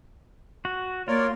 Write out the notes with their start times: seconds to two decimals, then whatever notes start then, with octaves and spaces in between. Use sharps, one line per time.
0.65 F#4
1.08 A#3 F4 A#4 C#5 D5